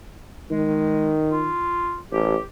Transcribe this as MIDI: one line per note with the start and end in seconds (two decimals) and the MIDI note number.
0.50 1.51 51
0.50 1.12 56
1.31 2.00 65
2.12 2.35 33
2.12 2.42 67